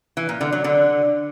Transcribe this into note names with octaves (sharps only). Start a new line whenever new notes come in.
E3
A#2
D3
F#3
D3